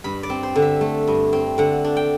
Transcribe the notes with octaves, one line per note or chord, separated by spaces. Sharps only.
G2 B5
D5
C4
C5
D3
E5
A3
G2
C4
D3 F#5
D4
G5